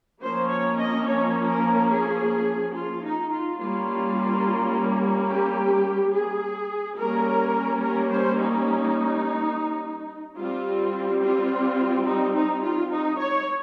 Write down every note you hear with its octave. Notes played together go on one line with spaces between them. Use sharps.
F3 A#3 C#4 C5
C#5
D#5
C#5
A#4
G#4
F4
D#4
F4
G3 A#3 C#4 F4
G4
G#4
G3 A#3 C#4 A#4
A#4
C5
D#4
G3 C4 F4
F4
D#4
D#4
F4
D#4
C#5